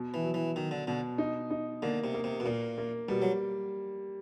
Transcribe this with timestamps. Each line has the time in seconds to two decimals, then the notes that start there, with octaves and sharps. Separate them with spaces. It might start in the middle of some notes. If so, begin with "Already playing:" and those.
Already playing: B2
0.14 E3
0.24 F#3
0.34 E3
0.55 D#3 F#3
0.71 D3
0.87 B2 D3
1.18 D#4
1.50 D#4
1.82 D3 A#3
2.04 C3
2.14 A#3
2.24 C3
2.40 B2
2.45 A#2 A#3
2.78 A#3
3.08 B2 G3
3.22 F#3